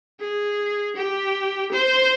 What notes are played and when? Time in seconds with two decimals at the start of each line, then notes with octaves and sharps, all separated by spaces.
0.20 G#4
0.96 G4
1.72 C5